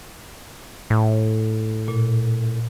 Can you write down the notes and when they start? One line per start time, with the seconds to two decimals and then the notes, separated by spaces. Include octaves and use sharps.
0.90 A2
1.88 A#2